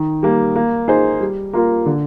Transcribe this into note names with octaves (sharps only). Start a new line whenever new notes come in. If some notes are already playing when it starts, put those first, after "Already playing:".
Already playing: D#3
G3 A#3
A#3
D#4 G#4 C5
G3
A#3 F4 A#4
D3